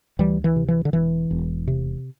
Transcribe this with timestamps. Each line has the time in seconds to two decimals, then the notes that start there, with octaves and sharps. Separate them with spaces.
0.19 D2 E3 G3
0.44 E3
0.56 C3
0.68 E3
0.85 D3
0.93 E1 E3
1.31 E1
1.68 C3